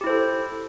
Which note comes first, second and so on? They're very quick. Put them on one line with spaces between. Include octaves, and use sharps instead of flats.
G4 E4 C5 A4